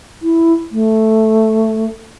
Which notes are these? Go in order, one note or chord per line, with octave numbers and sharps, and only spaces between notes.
E4
A3